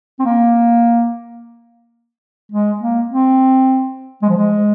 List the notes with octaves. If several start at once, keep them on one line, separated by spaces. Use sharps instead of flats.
C4
A#3
G#3
A#3
C4
G#3
F3
G#3